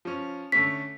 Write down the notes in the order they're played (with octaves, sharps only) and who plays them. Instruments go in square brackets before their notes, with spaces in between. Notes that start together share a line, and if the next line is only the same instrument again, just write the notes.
[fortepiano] F3 C#4
[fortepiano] D3 A3 C#4 [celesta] B6